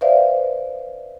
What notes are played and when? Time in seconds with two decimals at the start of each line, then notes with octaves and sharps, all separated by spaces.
0.01 B4 C5 D5 E5 F5